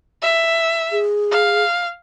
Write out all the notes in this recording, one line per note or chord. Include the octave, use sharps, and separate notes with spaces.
E5
G#4
F5